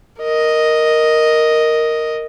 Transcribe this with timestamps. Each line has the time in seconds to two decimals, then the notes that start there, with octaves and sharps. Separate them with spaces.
0.22 A#4 D#5